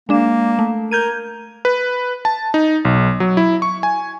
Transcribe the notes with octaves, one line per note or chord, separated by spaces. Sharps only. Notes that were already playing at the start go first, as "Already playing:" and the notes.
G#3 A#3 D4 E7
A3
A#4 G6 G#6 D#7
B4
A5
D#4
B1
F#3
E4
C#6
G#5